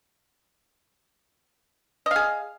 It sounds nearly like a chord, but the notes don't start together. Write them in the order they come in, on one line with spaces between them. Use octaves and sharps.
D#5 F5 G#4